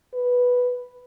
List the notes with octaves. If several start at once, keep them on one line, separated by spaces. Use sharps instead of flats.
B4